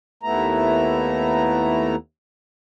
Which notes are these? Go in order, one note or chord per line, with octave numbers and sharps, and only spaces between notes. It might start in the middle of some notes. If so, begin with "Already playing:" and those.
D#2 A3 B3 E4 A#5